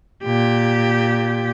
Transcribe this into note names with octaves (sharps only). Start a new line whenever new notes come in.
A#2 G4